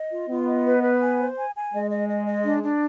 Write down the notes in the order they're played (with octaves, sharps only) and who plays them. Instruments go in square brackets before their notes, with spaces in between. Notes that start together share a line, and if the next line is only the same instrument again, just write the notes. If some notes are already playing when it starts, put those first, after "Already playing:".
Already playing: [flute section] D#5
F4
[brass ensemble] B3 [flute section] F4
[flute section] D#5
B4
B4
G#5
C5
G#5
G#5
[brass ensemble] G#3 [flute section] D#5
[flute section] D#5
D#5
D#5
D4
D4